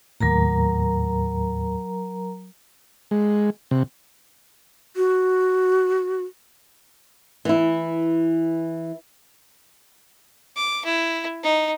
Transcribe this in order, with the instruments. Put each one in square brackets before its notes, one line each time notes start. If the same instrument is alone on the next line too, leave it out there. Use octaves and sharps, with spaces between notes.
[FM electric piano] D#2 A2 [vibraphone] F#3 A#4 A#5
[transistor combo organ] G#3
C3
[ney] F#4
[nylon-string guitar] E3 E4
[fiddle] D6
E4
D#4